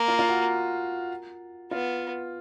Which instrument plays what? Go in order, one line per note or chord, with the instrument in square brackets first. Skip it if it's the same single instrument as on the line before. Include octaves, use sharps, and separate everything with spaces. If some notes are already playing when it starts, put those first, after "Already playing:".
Already playing: [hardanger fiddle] A#3
[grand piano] F4
F4
F#4
[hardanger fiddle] B3 [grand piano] F4